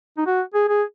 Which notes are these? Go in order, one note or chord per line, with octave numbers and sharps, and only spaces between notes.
D#4
F#4
G#4
G#4